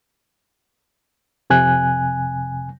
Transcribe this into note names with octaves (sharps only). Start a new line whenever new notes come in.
F2 C3 G#5 F#6